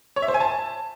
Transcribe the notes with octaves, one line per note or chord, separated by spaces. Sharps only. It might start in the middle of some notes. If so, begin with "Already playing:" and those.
C#5
E5
C5
G#5
A5